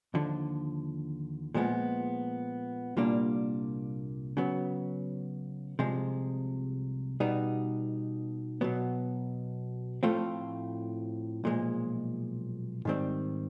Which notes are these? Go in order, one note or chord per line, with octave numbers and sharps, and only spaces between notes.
D#2 D3 F3
A#2 F3 G#3 B3
C2 A#2 G3 A#3 D4
C#3 F#3 B3
C2 C3 F3 G#3
B2 G3 B3 D#4
B2 F#3 B3
A2 F3 A3 C4 F4
B1 A#2 F3 G#3
G#2 D#3 G3 C4